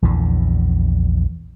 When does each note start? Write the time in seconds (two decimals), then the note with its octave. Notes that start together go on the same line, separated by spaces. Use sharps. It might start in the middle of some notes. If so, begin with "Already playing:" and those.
0.02 A#1 E2 D3 E3